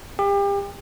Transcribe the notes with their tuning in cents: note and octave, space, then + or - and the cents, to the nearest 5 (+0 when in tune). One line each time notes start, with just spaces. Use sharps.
G4 +35